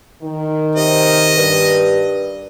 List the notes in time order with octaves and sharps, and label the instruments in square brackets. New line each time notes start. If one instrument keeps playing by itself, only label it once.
[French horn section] D#3
[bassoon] C3 [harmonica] D#5
[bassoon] G2